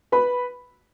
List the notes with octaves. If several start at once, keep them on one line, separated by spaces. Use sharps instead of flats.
B4 B5